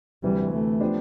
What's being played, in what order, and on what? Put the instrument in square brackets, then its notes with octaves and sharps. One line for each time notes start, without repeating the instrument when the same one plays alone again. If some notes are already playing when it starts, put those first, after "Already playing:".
[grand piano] D2 C3 E3 [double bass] G3
[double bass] A3
[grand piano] F3 B3 D4 G4 C5